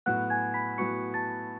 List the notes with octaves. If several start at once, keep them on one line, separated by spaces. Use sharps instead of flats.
A2 F#3 B3 F#4 F#5 F#6
G#5 G#6
B5 B6
A2 F#3 B3 F#4 C#6 C#7
A5 A6